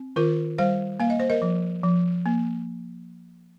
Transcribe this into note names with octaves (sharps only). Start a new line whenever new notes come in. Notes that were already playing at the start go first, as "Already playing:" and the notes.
Already playing: C4
D#3 F4 A#4
G3 C5 F5
A#3 F5
D#5
C5
A#4 D#5
F3
F3
A#3